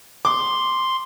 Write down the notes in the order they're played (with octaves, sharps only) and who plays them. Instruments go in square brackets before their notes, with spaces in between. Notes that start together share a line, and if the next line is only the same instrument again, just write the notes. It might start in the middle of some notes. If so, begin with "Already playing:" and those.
[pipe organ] C6 [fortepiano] D6